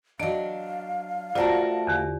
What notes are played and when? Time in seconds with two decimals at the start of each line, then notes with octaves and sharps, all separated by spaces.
0.19 F#3 D4 D#5 F5 D7
1.35 A3 F4 F#4 A#4 C5 D5 A5
1.87 E2 D3 G4